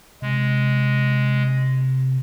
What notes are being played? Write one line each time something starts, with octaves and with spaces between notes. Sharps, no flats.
C3 G#3